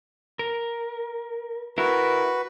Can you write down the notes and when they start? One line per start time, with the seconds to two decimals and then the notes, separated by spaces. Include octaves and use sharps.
0.39 A#4
1.78 E4 F#4 A#4 B4